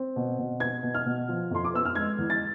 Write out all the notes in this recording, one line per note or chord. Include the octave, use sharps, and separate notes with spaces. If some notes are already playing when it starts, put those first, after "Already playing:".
Already playing: C4
B2
B2
B3 G#6
B2
F6
B2
F3
F2 C6
D6
B3 E6
F6
G#3 G#6
E2
A6